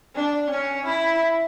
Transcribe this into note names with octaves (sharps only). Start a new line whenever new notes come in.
D4
C#4
E4